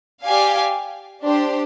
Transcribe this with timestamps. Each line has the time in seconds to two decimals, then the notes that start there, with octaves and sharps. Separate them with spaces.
0.24 G4 D5 F5 G#5
1.23 D4 G4 C5